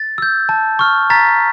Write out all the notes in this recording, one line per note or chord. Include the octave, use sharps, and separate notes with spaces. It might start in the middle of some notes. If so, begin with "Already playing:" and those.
Already playing: A6
E6 G6
A5
C#6 F6
A#5 A6 B6